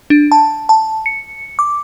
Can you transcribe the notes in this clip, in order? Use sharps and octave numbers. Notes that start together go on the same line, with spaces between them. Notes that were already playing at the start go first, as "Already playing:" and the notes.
D4
A5
A5
C#7
D6